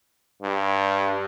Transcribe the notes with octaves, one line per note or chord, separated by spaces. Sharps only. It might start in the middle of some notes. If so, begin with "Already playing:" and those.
G2